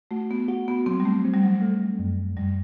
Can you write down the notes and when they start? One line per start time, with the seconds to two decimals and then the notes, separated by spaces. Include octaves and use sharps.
0.11 A3 F#4
0.31 B3
0.48 F#4
0.68 B3
0.86 F#3 C4
1.00 G3
1.05 A3
1.25 C4
1.33 G3
1.43 F#3
1.62 A3
1.99 F#2
2.37 F#2 G3